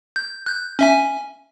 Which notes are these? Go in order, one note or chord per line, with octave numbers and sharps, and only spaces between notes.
G6
F#6 G6
C#4 E5 G#5